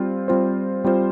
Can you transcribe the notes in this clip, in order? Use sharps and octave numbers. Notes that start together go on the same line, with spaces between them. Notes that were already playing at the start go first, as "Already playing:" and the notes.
Already playing: G3 C4 F4 C5
G3 C4 F4 C5
G3 C4 F4 C5